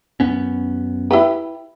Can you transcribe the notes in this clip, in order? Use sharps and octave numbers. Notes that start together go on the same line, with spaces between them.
F#2 B3 C#4
E4 G4 B4